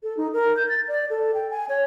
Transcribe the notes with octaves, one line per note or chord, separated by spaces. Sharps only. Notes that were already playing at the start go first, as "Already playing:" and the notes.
A4
D#4
A#4
G6
A6
D5
A4
G5
G#5
C#5